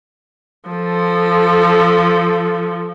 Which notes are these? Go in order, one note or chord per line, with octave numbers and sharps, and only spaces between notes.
F3 A4